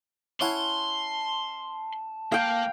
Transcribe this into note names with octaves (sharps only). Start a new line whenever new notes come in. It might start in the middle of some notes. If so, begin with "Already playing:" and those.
C#4 E4 F#5 A5 C6
A#3 F5 G5